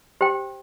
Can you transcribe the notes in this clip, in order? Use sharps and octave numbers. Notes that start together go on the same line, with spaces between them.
G4 C5 G5